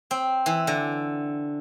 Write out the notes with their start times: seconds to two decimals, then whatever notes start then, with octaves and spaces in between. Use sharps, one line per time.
0.11 C4
0.46 E3
0.67 D3